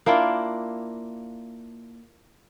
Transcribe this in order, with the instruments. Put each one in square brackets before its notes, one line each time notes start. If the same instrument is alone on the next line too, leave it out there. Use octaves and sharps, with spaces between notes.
[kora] A#3 D4 E4 F4